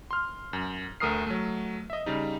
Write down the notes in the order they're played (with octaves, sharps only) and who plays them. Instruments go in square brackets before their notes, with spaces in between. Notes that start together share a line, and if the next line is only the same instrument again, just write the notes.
[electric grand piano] C6 F6
F#2
D2 A3 A#4 D#6 F6 C7
F#3 A3
D#5 E5
C#3 G3 D#4